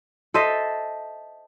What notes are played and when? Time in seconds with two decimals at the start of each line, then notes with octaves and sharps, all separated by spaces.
0.34 A4 C5 D#5 E5